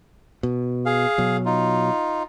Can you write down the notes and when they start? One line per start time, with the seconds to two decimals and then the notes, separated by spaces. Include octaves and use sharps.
0.43 B2
0.86 G#4 F5
1.18 B2 F#3
1.46 D#4 F4